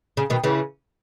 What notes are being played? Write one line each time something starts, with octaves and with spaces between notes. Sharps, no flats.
C#3
B2 D#3
C#3 E3